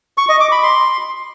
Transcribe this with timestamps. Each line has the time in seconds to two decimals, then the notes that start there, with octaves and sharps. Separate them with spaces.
0.18 C#6
0.29 D#5
0.40 D6
0.52 B5
0.63 C6